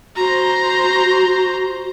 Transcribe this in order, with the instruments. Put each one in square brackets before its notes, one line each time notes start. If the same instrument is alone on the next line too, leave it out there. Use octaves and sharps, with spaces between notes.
[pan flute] F#4 [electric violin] C5 A#5